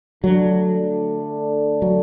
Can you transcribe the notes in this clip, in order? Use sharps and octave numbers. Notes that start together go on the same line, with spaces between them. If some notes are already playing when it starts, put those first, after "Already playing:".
D3 F#3 A3 D4
F#3